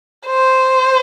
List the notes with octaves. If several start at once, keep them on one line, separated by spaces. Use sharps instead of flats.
C5